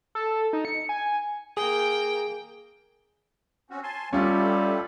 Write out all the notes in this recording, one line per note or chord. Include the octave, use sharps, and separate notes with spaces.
A4
D#4
C#7
G#5
A#3 G#4 G5
C4 C#4 F#4
G#5 A5 C6
G3 A3 C#4 F4 G4 A4